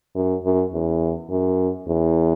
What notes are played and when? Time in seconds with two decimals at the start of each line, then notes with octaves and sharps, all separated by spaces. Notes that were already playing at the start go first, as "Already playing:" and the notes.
0.15 F#2
0.44 F#2
0.73 E2
1.30 F#2
1.87 E2